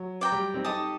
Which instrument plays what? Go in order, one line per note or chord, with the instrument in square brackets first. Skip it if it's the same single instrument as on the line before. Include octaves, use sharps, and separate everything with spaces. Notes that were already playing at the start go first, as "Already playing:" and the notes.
Already playing: [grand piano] F#3
[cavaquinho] D5 G5 A#5
[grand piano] G3
C4 D#4
[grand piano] D#4 G4 [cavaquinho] A4 D#5 A5 D#6